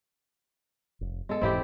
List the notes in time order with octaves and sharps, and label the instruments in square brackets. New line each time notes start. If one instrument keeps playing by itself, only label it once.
[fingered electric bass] F1
[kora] G#3 A4 [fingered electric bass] B3
[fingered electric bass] E1 G#2 E3 [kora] C4 E4 G4